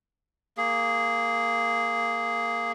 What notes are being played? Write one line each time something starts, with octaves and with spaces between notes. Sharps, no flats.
A#3 G#4